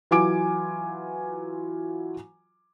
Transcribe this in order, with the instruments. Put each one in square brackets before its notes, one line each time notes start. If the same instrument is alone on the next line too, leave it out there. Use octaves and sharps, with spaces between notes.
[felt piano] E3 F#3 F4 G#5 D6 D7